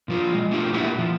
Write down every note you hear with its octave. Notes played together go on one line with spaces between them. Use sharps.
A#2 F3 F4
G#3
A3 D4 F4 G4
A#2 A#3 E4 B4 E5 F#5
F3